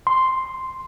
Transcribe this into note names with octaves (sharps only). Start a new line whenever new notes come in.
C6